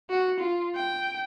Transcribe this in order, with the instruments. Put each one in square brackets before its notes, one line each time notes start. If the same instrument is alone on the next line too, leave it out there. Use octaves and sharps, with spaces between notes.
[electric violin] F#4
F4
G5